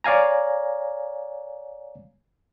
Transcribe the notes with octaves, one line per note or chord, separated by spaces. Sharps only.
C#5 D5 F5 G#5 A#5